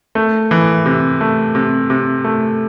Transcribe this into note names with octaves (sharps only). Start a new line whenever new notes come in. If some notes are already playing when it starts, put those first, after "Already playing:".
A3
E3
C3
A3
C3
C3
A3